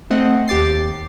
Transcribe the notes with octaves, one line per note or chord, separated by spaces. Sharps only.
A3 C4 D#5 F#5
D#2 G4 D6 A6 C7